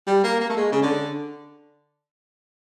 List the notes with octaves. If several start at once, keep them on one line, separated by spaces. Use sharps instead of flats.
G3
A#3
A#3
A3
G#3
C#3
D3